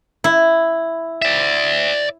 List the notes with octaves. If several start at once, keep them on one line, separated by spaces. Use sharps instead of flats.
E4
D5 E5